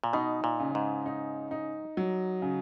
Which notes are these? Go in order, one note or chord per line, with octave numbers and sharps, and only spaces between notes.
A#2
B2 D#4
A#2
C#3
G#2
D#4
D#4
F#3
C#3